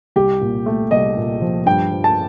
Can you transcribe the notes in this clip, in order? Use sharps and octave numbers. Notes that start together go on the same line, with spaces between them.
C2 G4
A#2
A3
C2 D#5
A#2
F3
G2 G5
F3
A5